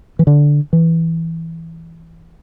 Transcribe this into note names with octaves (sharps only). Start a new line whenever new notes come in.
E3
D3
E3